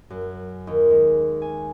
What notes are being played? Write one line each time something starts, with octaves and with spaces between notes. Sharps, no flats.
F#2
D#2
G#3
G#5